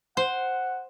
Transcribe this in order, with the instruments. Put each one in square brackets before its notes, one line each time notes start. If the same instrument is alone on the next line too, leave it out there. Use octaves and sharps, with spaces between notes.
[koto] C5 [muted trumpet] F#5